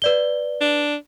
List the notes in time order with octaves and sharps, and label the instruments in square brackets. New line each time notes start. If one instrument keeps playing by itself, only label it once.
[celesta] B4 D5 G7
[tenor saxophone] D4